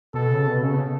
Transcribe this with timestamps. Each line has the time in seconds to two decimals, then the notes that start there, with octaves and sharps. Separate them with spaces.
0.14 B2 A4
0.30 C#3
0.47 B2
0.63 C#3